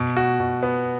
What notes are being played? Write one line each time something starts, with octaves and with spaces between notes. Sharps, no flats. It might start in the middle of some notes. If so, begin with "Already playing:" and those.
Already playing: B2
F#4
B2
B3